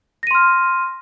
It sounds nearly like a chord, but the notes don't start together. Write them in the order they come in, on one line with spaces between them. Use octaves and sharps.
A#6 D#7 C6 F6